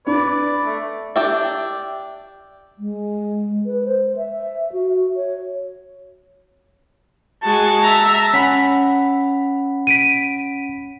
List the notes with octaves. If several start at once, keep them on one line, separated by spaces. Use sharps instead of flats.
D4 B4 D5
A3
D4 G4 E5
G#3
B4
C5
E5
F#4
C#5
G#3 F#4 A5
E5 A#5
C#4 F#5 B5 B6
B6 D7 D#7